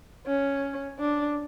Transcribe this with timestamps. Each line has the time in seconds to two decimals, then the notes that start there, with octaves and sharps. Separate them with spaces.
0.27 C#4
1.00 D4